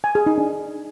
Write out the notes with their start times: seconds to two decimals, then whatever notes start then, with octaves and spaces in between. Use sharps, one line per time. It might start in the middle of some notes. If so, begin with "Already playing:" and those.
0.04 G#5
0.15 G#4
0.26 D#4
0.38 D4